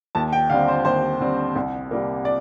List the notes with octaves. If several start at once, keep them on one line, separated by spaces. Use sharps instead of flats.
D#2 A5
G5
D3 G3 C4 F5
C5
D#2 C5
D3 G3 C4
C2
C3 G3 A#3
D5